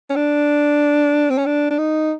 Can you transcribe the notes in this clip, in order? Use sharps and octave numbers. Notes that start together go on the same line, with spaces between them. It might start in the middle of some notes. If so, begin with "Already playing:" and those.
C#4
D4
C4
C#4
D4
D4
D#4